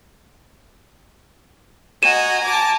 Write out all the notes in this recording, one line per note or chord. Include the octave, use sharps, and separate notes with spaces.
F#4 D#5 G#5 A#5 D#7 E7
A5 D6